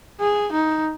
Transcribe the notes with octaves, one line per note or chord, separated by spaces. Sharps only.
G#4
D#4